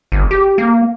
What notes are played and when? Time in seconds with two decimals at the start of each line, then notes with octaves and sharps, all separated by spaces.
0.12 G1
0.31 G4
0.58 A#3